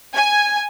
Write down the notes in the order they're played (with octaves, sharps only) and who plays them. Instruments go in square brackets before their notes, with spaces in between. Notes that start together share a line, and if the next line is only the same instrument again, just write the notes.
[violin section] G#5